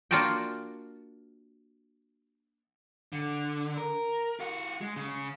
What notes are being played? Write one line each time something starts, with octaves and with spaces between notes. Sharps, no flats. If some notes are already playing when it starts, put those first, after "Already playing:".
A#3 D4 F4 F#4 A#4 G5
D3
A#4
F4 F#4
G#3
C#3